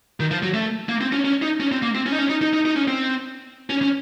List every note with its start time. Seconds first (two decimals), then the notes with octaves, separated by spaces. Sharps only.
0.20 D#3
0.31 F3
0.43 F#3
0.54 A3
0.89 A#3
1.01 C4
1.12 C#4
1.25 C#4
1.42 D#4
1.60 C#4
1.72 C4
1.82 A#3
1.95 C4
2.06 C#4
2.12 D#4
2.18 C#4
2.29 D#4
2.42 D#4
2.54 D#4
2.65 D#4
2.76 C#4
2.88 C4
3.70 C#4
3.82 C#4